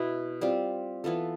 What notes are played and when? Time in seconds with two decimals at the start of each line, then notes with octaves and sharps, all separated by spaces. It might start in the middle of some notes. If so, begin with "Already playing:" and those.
Already playing: B2 B3 E4 B4
0.41 G3 C4 F4
1.04 E3 B3 F4 A4